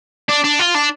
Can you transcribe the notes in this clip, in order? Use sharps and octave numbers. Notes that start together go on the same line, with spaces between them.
D4
D4
F4
D4